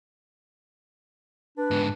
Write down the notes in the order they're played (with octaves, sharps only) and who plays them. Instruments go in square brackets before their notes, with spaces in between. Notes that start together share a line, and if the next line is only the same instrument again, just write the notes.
[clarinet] D4 [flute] B4
[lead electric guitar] G#2 B3